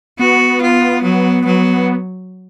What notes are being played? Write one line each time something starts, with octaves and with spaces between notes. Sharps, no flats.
B3 F#4
F4
F#3
F#3